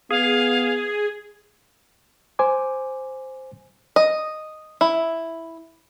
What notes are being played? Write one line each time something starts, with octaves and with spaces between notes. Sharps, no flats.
B3 G#4 F5
C5 G#5 D6
D#5
E4